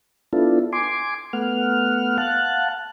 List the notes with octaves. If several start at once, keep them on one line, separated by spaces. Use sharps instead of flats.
B3 D4 E4 F4 A4
G#5 C6 D6
A3 B3 F#5 F6
F5 F#5 A5 F#6